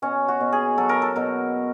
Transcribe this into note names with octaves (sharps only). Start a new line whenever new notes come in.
B2 C#4
F#4
B2
G#4
F#3 A4
A#4
A4
B2 A#4